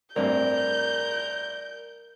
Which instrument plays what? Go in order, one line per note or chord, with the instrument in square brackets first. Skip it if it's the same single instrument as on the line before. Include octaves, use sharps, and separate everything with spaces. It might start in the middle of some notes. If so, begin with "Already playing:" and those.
[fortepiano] A1 G2 C4 [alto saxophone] A#4 [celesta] D5 [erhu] G6